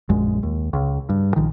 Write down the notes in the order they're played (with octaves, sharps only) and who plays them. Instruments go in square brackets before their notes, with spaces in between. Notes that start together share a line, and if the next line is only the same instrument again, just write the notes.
[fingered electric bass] A#1 F#2 G#3
D#2
C#2
G2
A#1 D#3